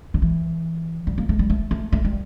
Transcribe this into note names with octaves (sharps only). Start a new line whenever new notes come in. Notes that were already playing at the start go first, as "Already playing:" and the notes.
D3
E3
G3
A#3
A3
G3
A3
A3
A3
G3